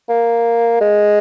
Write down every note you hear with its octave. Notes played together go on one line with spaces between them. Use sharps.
A#3
G#3